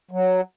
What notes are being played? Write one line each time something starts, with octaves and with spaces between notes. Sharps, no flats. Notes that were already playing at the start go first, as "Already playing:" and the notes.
F#3